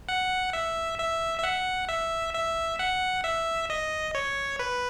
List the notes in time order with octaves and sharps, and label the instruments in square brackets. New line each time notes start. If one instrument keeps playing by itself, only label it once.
[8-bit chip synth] F#5
E5
E5
E5
F#5
E5
E5
F#5
E5
D#5
C#5
B4